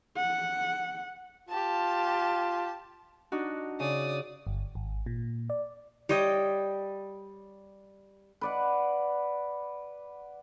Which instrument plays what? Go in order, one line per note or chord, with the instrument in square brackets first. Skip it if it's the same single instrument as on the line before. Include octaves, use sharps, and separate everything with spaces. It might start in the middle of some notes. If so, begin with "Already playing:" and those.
[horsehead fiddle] F#5
[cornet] F4 [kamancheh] G4 A5
[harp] D4 D#4 F#4
[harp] C#3 [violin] D5 D#6
[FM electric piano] G1
G#1
A#2
D5
[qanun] G3 C#5 D#5 G5
[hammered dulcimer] B4 D5 F#5